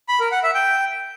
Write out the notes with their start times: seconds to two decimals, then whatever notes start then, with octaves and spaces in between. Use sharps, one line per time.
0.08 B5
0.20 A#4
0.31 F#5
0.43 E5
0.55 G5